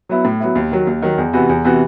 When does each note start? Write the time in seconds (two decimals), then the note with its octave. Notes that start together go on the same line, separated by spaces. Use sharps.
0.09 F#3 B3 E4
0.25 A2
0.40 F#3 B3 E4
0.55 D#2
0.71 D#3 F#3
0.87 D#2
1.02 D#3 F#3
1.18 E2
1.33 C3 E3 B3 F#4
1.49 E2
1.65 C3 E3 B3 F#4